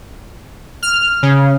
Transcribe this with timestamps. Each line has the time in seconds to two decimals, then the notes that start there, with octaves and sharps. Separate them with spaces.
0.83 F6
1.23 C#3